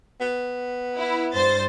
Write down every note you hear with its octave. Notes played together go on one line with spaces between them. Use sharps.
B3
E4
G2 C5 A6